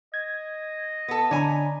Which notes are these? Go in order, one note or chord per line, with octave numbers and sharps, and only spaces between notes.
D#5 G#6
B3 A4
D3 C#5 D5 G#5 A#5 B5